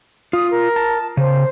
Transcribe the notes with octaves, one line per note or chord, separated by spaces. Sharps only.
F4 D#6
A#4
A5
C#3 C5